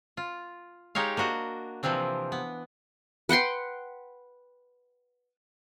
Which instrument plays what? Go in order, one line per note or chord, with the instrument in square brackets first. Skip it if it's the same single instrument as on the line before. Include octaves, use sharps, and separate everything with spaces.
[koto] F4
G#3 D#4 G4 C#5 F5
A#3 D4 F#4 D#5
C3 E3 F3 C4 D4
B3
[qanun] B4 F#5 G5 C6